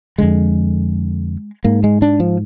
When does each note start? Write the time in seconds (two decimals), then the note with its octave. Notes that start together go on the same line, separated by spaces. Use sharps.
0.18 F2 D3 G#3
1.64 G#2 A#3
1.84 G#3
2.02 D4
2.20 F3